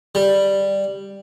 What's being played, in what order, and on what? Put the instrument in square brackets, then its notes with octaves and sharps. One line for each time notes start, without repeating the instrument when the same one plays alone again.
[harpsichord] G3